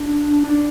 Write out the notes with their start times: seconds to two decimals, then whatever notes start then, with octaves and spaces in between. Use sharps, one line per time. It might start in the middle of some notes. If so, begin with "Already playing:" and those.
Already playing: D4
0.44 D4